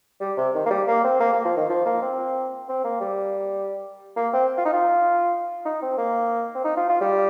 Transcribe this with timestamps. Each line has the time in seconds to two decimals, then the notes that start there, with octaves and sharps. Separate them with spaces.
0.20 G3
0.37 C3
0.54 D#3
0.66 A#3
0.70 G3
0.87 A#3
1.04 C4
1.20 A#3
1.32 A#3
1.45 F3
1.57 D#3
1.69 F3
1.86 A#3
2.02 C4
2.69 C4
2.84 A#3
3.01 G3
4.16 A#3
4.33 C4
4.57 F4
4.65 D#4
4.73 F4
5.66 D#4
5.82 C4
5.98 A#3
6.55 C4
6.64 D#4
6.77 F4
6.89 F4
7.01 G3